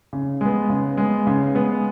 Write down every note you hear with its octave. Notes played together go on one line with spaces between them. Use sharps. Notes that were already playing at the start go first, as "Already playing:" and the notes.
C#3
G#3 B3
C#3
G#3 B3
C#3
G#3 B3